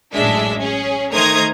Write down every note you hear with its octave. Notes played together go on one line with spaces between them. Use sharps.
A1 F#2 G#3 D4 E5
C#4 G#4
D#3 A3 C5 A#5 D#6 G#6